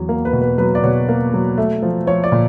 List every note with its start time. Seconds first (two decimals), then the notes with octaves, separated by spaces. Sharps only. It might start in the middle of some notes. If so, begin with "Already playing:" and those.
Already playing: E2 F#3
0.09 A#3
0.25 B4
0.33 B2
0.42 B4
0.58 F#3 B4
0.75 D5
0.83 B2 C#5
1.09 A#3
1.33 F#3
1.58 A3
1.82 F3
2.07 F3 C#5
2.24 D5
2.32 A#2